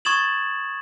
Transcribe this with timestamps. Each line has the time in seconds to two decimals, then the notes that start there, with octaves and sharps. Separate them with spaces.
0.05 C#6 D#6 G#6 A6 E7 F#7